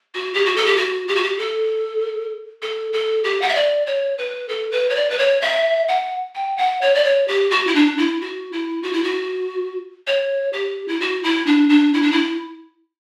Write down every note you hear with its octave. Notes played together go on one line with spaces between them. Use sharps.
F#4
G4
F#4
A4
G4
F#4
G4
F#4
G4
A4
A4
A4
G4
F#5
E5
D5
C#5
B4
A4
B4
C#5
D5
B4
C#5
E5
F#5
G5
F#5
C#5
D5
C#5
G4
F#4
E4
D4
E4
F#4
E4
F#4
E4
F#4
C#5
G4
E4
F#4
E4
D4
D4
E4
D4
E4